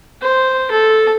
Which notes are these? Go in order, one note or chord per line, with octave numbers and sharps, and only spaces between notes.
C5
A4